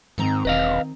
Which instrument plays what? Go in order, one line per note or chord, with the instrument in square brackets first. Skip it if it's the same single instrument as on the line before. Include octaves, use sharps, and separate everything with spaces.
[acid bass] G#2 [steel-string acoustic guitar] D#3 C4 A#5
[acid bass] E1 [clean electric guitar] B4 D#5 F5